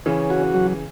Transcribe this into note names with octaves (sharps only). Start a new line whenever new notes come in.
C#3 E3 C#4
F#4
F#3